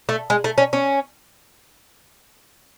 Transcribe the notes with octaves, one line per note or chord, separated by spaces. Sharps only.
A3
G#3
A3
C#4
C#4